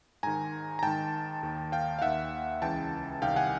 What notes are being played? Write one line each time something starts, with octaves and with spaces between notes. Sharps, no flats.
G#2 D#3 G#5 A#5
A#5
G#2 D#3 G5 A5
D#2 D#3
F5 G5
F5
D#2 D#3 E5 F#5
C#2 C#3 E3 G5 A5
C2 C3 D#3 F5 G5
F#5 G#5